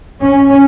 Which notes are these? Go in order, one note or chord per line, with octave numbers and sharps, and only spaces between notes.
C#4